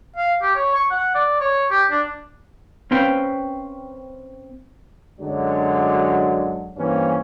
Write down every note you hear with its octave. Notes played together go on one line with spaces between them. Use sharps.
F5
G4
C#5
C#6
F#5
D5
C#5
G4
D4
C4 C#4 B4 F5 G5
F#2 D3 F#3 G#3 D4
G2 E3 A#3 C4 C#4